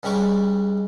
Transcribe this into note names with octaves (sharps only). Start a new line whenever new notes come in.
G2 C#3 G3 G#3 C#6 D6